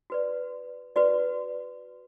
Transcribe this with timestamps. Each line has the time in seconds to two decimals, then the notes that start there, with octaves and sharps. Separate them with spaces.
0.10 F#4 B4 D5
0.96 F#4 B4 D5